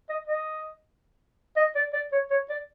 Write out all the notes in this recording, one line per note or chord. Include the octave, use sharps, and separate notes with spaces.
D#5
D#5
D#5
D5
D5
C#5
C#5
D5